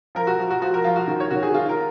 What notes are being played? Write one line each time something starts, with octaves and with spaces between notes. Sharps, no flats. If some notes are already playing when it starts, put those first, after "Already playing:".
F3 A#4
F#4
F3
F#4
F3 F#4
A#4
F3 F4
F#4
D#3
C#5
D#3 F#4
G#4
D#3 F4
A#4